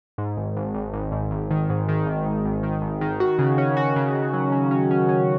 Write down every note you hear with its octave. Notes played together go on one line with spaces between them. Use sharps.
G#2
G#1
G#1
G#1
G#1
G#2
G#1
D#3
G#2
D#3
G#1
G#1
G#1
D#3
G#1
D#3
F#4
C#3
C#4
F#4
C#3
C#3
F#3
C#4
C#4
C#4
C#4